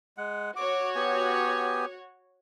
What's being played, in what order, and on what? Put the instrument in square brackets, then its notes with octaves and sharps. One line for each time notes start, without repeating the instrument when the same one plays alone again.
[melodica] G#3 F#5
[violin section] F#4 C#5 [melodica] D6
[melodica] B3 G4 G#5